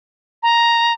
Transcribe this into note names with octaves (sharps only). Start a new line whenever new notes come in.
A#5